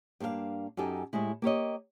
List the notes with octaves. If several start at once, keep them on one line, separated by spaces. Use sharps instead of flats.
G2 A#3 D4 A4 F5
F#2 D#4 G4 A4 G#5
A2 G3 G#3 E4
A#3 G4 C#5 D#5